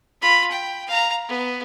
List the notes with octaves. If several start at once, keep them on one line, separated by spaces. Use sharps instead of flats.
F4 B5
G5
F5 A#5
B3